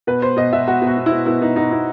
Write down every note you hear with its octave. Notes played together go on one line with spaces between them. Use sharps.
B2 B4
B2 C5
B2 D#5
B2 E5
B2 F#4
B2
F#4
B2
E4
B2
B2 E4
B2 D#4
B2 D#4
B2 E4